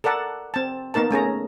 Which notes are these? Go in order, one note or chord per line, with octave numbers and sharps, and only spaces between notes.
A4 A#4 D5 F#5 A5
C4 A5
A#3 B3 D#4 A#4 A5
A3 C#4 G#4 A#5